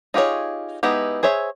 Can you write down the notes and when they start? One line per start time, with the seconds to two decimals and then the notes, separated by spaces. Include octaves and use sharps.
0.14 D#4 F4 G4 G#4 C#5
0.83 G#3 B3 D#4 E4 G4
1.23 G#4 C5 C#5 E5